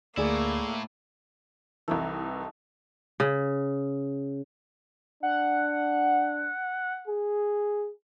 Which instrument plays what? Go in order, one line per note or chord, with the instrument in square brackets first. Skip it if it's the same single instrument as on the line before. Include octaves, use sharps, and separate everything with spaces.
[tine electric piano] D2 [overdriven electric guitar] A2 E4 [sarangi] A#3 [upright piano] G#4 D5
[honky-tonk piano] C2 E3 [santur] A3 D#4
[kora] C#3
[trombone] D4 [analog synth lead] F#5
[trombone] G#4